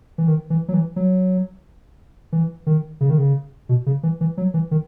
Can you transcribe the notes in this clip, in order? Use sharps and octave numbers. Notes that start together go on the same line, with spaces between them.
E3
D#3
E3
F#3
E3
F#3
E3
D#3
C#3
D#3
C#3
B2
C#3
E3
E3
F#3
E3
D#3